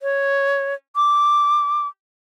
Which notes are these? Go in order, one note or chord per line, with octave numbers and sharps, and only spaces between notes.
C#5
D6